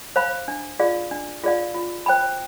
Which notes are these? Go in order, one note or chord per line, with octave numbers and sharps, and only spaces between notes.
C5 F5 B5
D4
F4 G#4 D5 F5
D4
F4 G#4 D5 F5
F4
C5 G5 B5